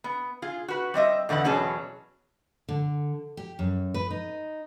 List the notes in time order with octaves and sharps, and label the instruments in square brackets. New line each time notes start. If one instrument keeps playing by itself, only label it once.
[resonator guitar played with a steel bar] B3
F4 G#4
F#4 B4
G3 C4 D#5 E5
E2 D3 D#3 B4 F#5
E2 B2 F#3 C#4 G#4 A5
[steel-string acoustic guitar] D3
G4
F#2
B4
D#4